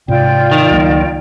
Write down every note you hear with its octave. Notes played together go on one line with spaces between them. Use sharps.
G#2 C3 F4 D5 G5
D#3
C#2 F#3 A#3